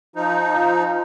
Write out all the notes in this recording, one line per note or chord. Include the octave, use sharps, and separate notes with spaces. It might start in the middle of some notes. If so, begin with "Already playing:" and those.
F3 D#4 F4